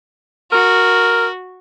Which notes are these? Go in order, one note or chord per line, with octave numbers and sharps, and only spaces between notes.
F#4 A#4